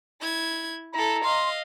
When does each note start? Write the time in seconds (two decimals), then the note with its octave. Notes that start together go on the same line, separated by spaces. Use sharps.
0.21 E4 G#6
0.94 E4 A4 A#5
1.24 D#5 F5 C6